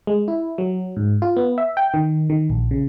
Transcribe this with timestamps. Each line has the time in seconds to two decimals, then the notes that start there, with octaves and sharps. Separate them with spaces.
0.07 G#3
0.28 E4
0.58 F#3
0.97 G#2
1.22 F4
1.37 B3
1.58 E5
1.77 G5
1.94 D#3
2.30 D#3
2.50 A#1
2.71 C#3